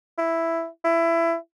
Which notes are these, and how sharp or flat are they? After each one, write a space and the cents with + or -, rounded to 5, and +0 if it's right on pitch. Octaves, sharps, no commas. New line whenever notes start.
E4 +5
E4 +20